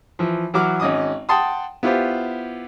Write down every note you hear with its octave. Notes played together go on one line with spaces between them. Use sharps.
E3 F3
E3 F#3 F#4 D6 F6
G#1 C#4 D#5 D6 D#6
F#5 G5 A5 C6 D#6
B3 E4 F4 G4 C5